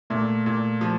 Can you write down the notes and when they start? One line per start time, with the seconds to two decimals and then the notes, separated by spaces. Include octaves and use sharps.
0.10 A#2 A3
0.46 A#2
0.81 F3